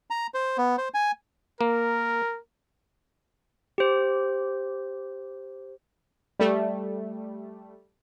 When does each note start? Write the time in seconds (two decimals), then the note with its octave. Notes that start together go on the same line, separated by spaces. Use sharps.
0.10 A#5
0.34 C5
0.58 B3
0.78 C5
0.94 G#5
1.61 A#3 A#4
3.78 G4 C5
6.39 G3 A3